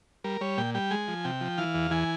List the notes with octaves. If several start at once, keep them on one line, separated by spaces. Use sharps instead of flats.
G3 A#4
G3 C#5
A#2 G5
G3 G5
G#3 G#5
F3
C3 G5
F3
E3 F5
E2
E3 G#5